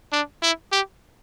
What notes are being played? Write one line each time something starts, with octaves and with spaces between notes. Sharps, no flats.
D4
E4
G4